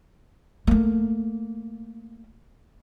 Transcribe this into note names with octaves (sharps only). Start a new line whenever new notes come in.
A3 A#3